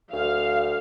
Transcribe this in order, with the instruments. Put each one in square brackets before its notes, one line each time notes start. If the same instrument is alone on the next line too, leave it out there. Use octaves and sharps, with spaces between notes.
[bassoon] D2 [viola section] F5